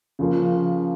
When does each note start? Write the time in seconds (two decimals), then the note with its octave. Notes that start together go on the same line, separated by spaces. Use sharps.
0.19 C#3 F3 A#3 F4